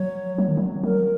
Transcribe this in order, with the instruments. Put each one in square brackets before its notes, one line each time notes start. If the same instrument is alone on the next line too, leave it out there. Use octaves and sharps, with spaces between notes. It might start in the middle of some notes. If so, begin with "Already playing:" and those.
Already playing: [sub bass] F#3 [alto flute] C#5
[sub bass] F#3
D#3
F#3
[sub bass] F#3 [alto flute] A#4